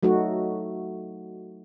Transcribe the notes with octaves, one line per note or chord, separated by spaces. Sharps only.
F#3 A3 D#4 F#4